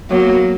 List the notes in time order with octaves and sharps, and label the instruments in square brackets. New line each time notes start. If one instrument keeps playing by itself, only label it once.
[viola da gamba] F#3 A#3 [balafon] B3 F#4 C#5